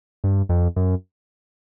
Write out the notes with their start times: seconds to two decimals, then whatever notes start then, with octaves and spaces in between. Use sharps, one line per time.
0.24 G2
0.49 F2
0.76 F#2